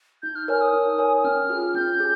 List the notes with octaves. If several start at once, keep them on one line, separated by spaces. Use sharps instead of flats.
D#4 G6
F6
A#4 C#5 G#5 F6
D#6
D#4
A#4 C#5 G#5
D#6
C#4 F6
F4 G#4
C#4 G6
G#4